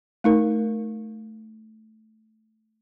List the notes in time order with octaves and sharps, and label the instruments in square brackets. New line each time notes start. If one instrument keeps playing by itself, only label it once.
[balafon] A3 D#4 A#4